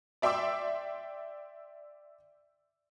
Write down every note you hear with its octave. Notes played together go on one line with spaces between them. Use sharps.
D5 E5 G5 C6 D6 E6